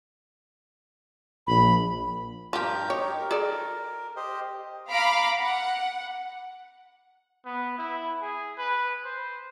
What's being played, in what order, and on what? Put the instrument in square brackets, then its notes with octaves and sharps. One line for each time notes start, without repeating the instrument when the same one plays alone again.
[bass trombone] A#1 [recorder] B5
[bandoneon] G2 A#4 G6 [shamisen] F3 G4
[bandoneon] D#4 G4 [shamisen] C#5
[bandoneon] A#4
[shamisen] G#4 A4 D5
[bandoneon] G4 C5 D#5
[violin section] F5 A#5 B5 D6
F#5
[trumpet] B3
E4
G#4
B4
C5